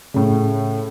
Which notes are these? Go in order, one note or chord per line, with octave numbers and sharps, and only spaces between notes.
A2 C#3